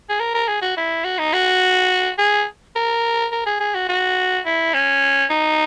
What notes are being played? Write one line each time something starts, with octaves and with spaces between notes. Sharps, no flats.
G#4
A#4
A#4
G#4
F#4
E4
F#4
D#4
F#4
G#4
A#4
A#4
G#4
G#4
F#4
F#4
E4
C#4
D#4